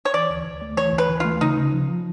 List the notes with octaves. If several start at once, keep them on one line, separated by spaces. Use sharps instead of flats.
C#5
E3 D5
D2
D2
A3
E3 C#5
D2
B4
E3
A3 F4
C#3 D#4
C#3
F3
F3